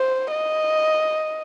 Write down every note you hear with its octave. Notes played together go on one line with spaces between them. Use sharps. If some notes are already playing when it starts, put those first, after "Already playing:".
Already playing: C5
D#5